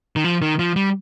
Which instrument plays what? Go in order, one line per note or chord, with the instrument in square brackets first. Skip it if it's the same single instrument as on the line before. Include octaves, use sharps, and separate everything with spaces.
[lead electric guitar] D#3
F3
D#3
F3
G3